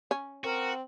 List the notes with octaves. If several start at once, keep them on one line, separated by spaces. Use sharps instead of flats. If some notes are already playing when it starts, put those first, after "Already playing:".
C#4
C4 F#4 A#4